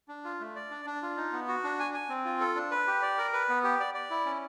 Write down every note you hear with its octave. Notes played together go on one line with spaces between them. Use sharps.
D4
F4
A3
D5
D4
D4
F4
D#4
B3
F#4
D4
G#5
G#5
C4
F4
A4
D4
B4
G4
D5
A#4
B4
B3
G4
D5
D5
E4
C#4